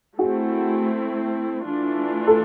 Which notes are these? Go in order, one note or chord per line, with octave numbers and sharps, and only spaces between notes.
A3 C4 E4 F#4 G#4
E3 A3 D4 F4
A4